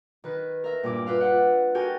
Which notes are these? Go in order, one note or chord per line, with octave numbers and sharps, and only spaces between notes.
D#3 B4
A#4 E5
G2 A#2 E4 D6
F4 B4 E5 F5
F4 D5 E5 F#5
F#4 G4 A4 A#4 G5 G#5